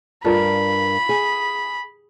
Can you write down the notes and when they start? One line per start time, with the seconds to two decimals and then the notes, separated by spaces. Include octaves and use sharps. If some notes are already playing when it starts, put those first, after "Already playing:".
0.25 G2 F4 A4 A#4 B5
1.09 G#4